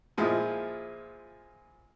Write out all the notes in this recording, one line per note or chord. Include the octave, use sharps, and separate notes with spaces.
A#2 F3 G#3 E4 F4